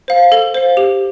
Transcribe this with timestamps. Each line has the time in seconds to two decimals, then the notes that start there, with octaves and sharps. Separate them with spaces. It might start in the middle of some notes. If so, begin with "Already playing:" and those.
0.08 C5 F5
0.32 A4
0.54 C5 F5
0.77 G4